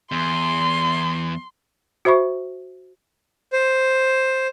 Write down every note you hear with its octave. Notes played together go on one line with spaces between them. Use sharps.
E2 C6
F#4 C5 E5 B5 C#6
C5